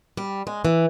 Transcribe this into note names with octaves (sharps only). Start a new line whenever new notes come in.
G3
G#3
E3